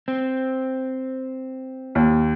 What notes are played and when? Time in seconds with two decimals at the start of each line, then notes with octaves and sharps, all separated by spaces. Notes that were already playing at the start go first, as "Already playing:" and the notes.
0.08 C4
1.95 D#2